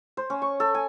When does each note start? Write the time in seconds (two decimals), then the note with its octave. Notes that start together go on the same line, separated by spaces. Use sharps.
0.17 C5
0.30 C#4
0.42 C#6
0.60 A4
0.74 G#5